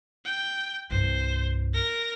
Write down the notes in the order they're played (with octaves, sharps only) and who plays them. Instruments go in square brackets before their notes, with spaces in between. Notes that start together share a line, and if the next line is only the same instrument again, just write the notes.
[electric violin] G5
[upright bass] C2 G2 [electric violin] C5
[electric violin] A#4 A#6